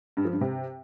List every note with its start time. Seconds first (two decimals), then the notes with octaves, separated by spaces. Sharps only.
0.17 G2
0.25 F3
0.33 G2
0.41 C3